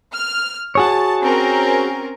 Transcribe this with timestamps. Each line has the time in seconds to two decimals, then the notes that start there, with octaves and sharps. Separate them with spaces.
0.12 F6
0.75 F#4 G#4 C#5 A5
1.20 C4 C#4 A#4